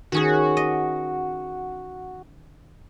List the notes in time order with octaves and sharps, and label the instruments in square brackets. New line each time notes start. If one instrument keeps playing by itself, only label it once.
[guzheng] D#3 C#4 G#4 [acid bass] F#4
[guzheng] D#5